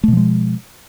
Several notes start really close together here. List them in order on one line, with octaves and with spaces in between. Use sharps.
A3 B2 F3 G#3